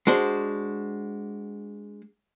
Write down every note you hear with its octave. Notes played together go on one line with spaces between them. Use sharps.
G#3 D4 F#4 C5